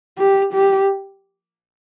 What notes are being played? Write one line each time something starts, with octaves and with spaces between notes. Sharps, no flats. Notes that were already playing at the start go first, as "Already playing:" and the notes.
G4
G4